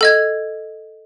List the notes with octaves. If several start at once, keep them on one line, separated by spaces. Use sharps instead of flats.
A4 D#5 G#6